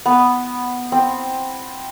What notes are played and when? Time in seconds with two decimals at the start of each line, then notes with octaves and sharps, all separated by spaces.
0.06 B3
0.92 C4